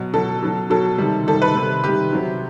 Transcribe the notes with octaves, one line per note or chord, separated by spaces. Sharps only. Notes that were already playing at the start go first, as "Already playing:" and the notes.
Already playing: B2 F#3
B2 F#3 A4
B2 F#3
B2 F#3 A4
C3 D#3 G3
C3 D#3 G3 A4
B4
C3 D#3 G3
C3 D#3 G3 G4
C3 F#3